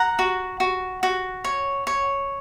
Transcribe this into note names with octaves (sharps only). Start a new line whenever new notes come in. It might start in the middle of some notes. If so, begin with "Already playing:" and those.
Already playing: F#5 A#5
F#4
F#4
F#4
C#5
C#5